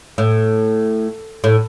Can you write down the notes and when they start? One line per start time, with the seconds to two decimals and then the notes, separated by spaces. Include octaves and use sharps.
0.18 A2
1.44 A2